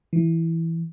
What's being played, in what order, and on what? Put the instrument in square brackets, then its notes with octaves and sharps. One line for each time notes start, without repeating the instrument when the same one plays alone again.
[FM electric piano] E3